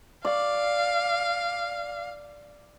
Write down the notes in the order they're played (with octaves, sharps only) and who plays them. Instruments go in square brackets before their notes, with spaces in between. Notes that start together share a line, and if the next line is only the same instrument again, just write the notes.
[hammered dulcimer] D5 [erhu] F5